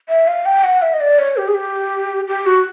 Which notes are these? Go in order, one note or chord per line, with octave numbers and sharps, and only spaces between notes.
E5
F5
G5
F#5
E5
D#5
D5
C#5
G4
G#4
G4
G4
F#4